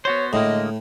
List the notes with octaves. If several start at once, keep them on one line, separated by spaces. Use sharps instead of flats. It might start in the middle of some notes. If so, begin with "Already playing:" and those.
B3 F#4 C5 C#5
A2 D3 G#3 A#3 D#5